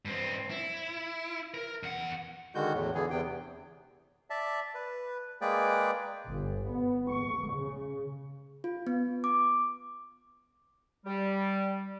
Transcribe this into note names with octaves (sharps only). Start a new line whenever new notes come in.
G2 C4
E4
A#4
E2 F#5
D3 D#3 G#3 F#4 G6
E2 A2
D3 E3 B3 G#4
E2 C3 B3 G5
D5 E5 A5
B4
G#3 A#3 G#4 B4 D5 G5
G1
B3
C#6
C#3
F4
B3
D6
G3